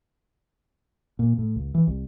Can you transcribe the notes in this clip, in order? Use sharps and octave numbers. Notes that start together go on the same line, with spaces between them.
A#2
A2
C#2
E3
C2